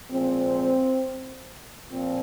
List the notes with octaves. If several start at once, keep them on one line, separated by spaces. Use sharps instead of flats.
A#2 F3 G#3 C4
A#2 F3 C4